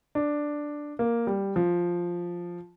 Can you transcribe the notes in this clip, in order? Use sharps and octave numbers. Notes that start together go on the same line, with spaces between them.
D4
A#3
G3
F3